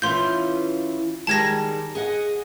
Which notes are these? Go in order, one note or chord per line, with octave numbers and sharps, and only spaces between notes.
E3 C#4 F4 C6 G6
D#3 G3 G#3 A5 G#6 A#6
G#4 D#5 F#5